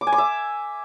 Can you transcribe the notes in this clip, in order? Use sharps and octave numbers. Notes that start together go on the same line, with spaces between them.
D6
G#5
D6
E5